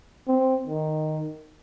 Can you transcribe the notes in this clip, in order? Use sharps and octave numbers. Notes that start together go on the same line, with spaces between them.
C4
D#3